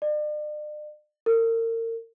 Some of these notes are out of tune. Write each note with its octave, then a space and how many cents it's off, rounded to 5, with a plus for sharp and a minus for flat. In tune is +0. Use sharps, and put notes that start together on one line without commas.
D5 +40
A#4 -35